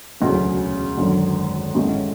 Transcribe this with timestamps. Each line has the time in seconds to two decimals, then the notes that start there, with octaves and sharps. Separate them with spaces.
0.21 E1 D2 C#3 F#3 C#4
0.98 G#1 F#2 D3
1.75 A1 A2 G#3 C#4